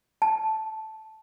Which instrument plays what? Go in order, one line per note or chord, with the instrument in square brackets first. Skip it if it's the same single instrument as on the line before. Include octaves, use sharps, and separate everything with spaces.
[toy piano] A5